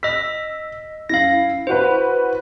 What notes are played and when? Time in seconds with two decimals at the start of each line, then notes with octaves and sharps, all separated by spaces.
0.03 D#5 E6 B6
1.09 F#2 E4 F5 A#6
1.67 E4 F#4 B4 C5